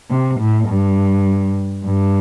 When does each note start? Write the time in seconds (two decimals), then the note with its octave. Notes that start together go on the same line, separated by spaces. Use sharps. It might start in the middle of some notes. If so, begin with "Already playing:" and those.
0.10 C3
0.40 A2
0.69 G2
1.85 G2